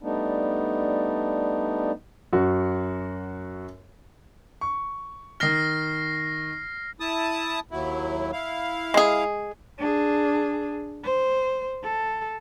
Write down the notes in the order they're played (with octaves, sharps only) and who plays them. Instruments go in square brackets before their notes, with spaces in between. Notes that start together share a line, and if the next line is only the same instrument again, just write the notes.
[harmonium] G3 A3 B3 D4 D#4
[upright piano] F#2 F#4
C#6
[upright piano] D#3 G7 [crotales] F6 A#6 C7
[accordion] E4 A5 D#6
D#2 F#3 E4
E4 F5
[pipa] G#3 G#4
[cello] D4 G#4
C5
A4